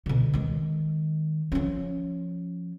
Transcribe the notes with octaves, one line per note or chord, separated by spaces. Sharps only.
B2 D3
D#3 G#3
F3 C#4